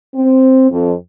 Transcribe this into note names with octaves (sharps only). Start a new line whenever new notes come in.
C4
F2